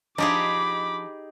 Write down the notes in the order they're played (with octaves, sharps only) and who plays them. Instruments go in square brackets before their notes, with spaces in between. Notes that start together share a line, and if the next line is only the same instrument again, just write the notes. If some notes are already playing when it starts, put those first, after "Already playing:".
[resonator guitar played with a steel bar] F3 D4 D#5 [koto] D#4 G4 G#4 [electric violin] B5 D6